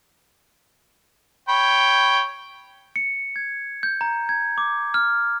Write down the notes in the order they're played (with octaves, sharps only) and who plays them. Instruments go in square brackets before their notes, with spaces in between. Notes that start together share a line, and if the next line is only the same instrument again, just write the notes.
[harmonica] C#5 G5 B5
[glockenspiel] C#7
G#6
G6
A#5
G#6
D6
F6